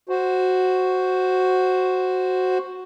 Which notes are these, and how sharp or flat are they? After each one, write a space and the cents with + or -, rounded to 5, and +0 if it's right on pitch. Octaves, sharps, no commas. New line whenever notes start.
F#4 +0 C5 +0